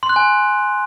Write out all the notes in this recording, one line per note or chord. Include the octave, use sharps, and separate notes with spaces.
C6
F#6
G#5